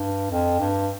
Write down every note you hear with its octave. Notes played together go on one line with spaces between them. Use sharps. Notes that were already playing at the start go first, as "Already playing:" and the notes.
Already playing: G2
F2
G2